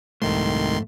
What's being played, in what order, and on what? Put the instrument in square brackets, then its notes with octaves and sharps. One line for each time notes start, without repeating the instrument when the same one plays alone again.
[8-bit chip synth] C2 D#3 C6 [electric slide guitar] F2 G#2 A3